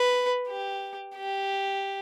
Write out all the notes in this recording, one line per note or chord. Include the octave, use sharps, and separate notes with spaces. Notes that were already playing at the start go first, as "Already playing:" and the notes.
Already playing: B4
G4
G4